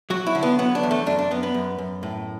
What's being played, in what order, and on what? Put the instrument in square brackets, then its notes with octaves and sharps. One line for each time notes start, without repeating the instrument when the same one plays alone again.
[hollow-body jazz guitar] F#3 F#4
E4
D3
B3
F#3 B3
D4
E2
A3
F#2 D4
D4
F#2 B3
B3
F#2
F#2
A2